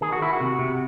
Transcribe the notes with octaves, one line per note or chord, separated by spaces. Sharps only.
D#3 G#4
F#4
D#3 E4
F#4
C3
C3